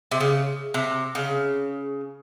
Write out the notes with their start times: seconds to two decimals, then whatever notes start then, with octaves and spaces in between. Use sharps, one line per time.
0.12 C3
0.20 C#3
0.74 C3
1.15 C#3